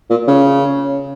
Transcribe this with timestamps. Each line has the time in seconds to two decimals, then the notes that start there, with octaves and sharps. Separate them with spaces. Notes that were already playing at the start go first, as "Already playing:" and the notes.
0.10 A#2
0.28 C#3